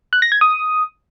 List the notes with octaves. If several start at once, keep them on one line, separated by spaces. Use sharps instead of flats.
F#6
A#6
G#6
D#6